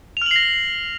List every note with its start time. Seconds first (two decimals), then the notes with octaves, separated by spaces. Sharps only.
0.17 F7
0.22 F6
0.26 F#7
0.31 C7
0.36 A#6